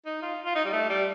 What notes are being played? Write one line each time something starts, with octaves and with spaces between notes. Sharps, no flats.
D#4
F4
F4
D#4
G3
A3
G3